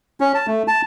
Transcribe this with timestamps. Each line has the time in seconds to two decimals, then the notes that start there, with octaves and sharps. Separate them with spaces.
0.20 C#4
0.34 A5
0.47 A3
0.68 A5